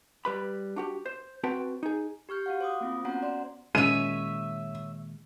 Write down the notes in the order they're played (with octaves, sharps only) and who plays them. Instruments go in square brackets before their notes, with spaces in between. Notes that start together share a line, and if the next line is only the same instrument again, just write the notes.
[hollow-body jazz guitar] G3 B4 B5
D4 F#4 G4
C5
C4 F#4 B4 G5 A5
D#4 G#4
[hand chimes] G4 C#6 F6 G6
F#4 F5 F#5
C5 D6 D#6
A#3 C4 F4
B3 C#4 F#4 C5 F#5 A#5
D5 C6
[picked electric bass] A#2 D#3 G#3 [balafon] C#4 [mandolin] C#5 E5 [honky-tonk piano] D#7